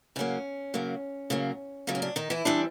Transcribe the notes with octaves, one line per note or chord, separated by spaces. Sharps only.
C#3 F#3 A#3 C#4
C#3 F#3 A#3
C#3 F#3 A#3
C#3 F#3 A#3
C#4
D4
D#3 D#4
E3 E4
E3 G3 C4 D4